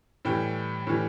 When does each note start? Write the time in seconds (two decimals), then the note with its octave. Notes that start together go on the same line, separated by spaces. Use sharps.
0.25 A2 E3 G3 G5
0.87 A2 E3 G3